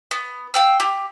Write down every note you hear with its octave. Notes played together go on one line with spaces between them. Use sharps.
B3
F5 G5 E6
G4